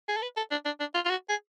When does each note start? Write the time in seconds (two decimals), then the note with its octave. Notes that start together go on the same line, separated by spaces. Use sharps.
0.08 G#4
0.17 A4
0.22 B4
0.37 A4
0.51 D4
0.65 D4
0.80 D4
0.94 F4
1.05 F4
1.10 F#4
1.29 G#4